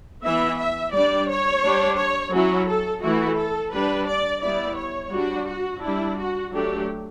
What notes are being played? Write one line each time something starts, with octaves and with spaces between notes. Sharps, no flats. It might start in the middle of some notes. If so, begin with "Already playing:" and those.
E3 B3 E4 E5
E5
G3 D4 D5
C#5
G3 D4
C#5
F#3 C#4 E4 F#4
A4
E3 A3 E4 F#4
A4
G3 D4 B4
D5
G3 B3 E4 D5
C#5
G3 D4 F#4
F#4
G3 D4 E4
F#4
F#3 A3 D4 G4